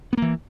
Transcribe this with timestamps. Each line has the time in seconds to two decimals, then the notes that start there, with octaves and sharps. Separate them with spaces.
0.13 B3
0.17 A#3
0.22 E3